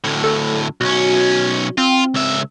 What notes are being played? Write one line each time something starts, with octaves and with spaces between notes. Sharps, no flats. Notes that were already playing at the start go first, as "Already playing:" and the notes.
D2 A2
A4
B1 C#4 F#4
C4 F4
C#2 E5